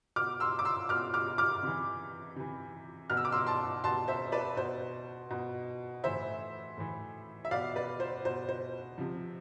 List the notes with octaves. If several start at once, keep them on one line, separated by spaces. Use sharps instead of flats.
B2 D6 F6
C6 E6
D6
C6 E6
B2 D6 F6
D6 F6
D6 F6
C3 E3
C3 E3
B2 F6
E6
D6
C6 E6
A5 C6
B2 A5 C6
C5 E5
B4 D5
B2 C5
B2
A2 E3 C5 E5
A2 E3
E5
B2 D5 F5
B4 D5
C5
B2 C5
C5
C3 F3